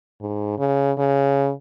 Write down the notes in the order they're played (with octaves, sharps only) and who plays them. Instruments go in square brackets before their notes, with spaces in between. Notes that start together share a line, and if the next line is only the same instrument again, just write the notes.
[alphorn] G#2
C#3
C#3